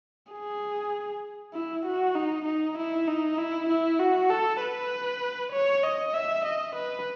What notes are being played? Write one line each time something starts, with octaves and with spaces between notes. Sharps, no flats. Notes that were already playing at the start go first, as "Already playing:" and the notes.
G#4
E4
F#4
D#4
D#4
E4
D#4
E4
E4
F#4
A4
B4
C#5
D#5
E5
D#5
B4